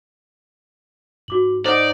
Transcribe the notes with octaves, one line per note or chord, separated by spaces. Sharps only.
G#2 F#4 D6 F#7
D#4 C5 D5 F#5